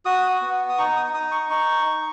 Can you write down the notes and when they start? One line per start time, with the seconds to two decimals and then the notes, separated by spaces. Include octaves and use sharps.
0.05 F#4 D#6
0.41 B3
0.69 D#6
0.78 D#4 C#6
0.97 D#6
1.13 D#4 D#6
1.32 C#6
1.50 D#4 C#6
1.86 D#4